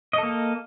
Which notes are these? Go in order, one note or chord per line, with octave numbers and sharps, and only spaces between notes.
A#3 A4 D#5